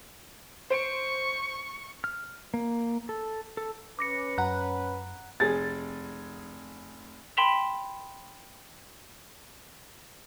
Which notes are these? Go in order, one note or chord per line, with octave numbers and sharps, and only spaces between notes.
C5 C#6 D7
F6
A#3
A4
A4
C#4 B4 D6 A#6 C#7
F#2 F#5 A#5 F#6
F1 G#4 A6
G5 B5 C6 B6 E7 F7